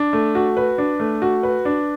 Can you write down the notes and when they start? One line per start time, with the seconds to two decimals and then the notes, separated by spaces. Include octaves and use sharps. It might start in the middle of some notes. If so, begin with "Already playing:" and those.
Already playing: D4
0.13 A3
0.35 F#4
0.57 B4
0.78 D4
1.00 A3
1.22 F#4
1.43 B4
1.65 D4